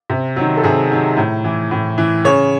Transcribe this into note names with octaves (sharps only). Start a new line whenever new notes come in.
C3
D#3 F#3
A4
C3 G#4
D#3 F#3
A2
E3
A2
E3
C#3 C#5